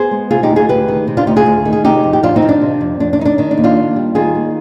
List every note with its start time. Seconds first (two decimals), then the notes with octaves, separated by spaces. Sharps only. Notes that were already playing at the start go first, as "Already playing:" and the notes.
Already playing: B3 G#4 C5
0.11 G#3
0.31 C3 F4 G#4
0.43 D#4 G4
0.50 D2
0.56 F4 G#4
0.69 D2 G4 B4
0.88 D#3
1.07 C3
1.17 D4 F4
1.27 D2 D#4 G4
1.36 F4 G#4
1.46 D2
1.65 D#3
1.73 G#4
1.84 C3 D#4 G4
2.03 F2
2.13 G4
2.23 F2 D4 F4
2.36 C4 D#4
2.42 D#3
2.49 D4
2.61 C3
2.81 F2
3.00 F2 D4
3.13 D4
3.19 D#3 D#4
3.25 D4
3.38 D#3 D4
3.51 D4
3.57 D#2
3.64 D4 F4
3.76 D#2
3.96 G3
4.15 D#3 F4 G#4
4.35 D#2